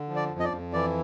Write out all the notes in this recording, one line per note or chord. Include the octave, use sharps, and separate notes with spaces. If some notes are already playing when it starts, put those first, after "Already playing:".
Already playing: D3
F3
D5
F2
D#5
D5
F2
E3 D5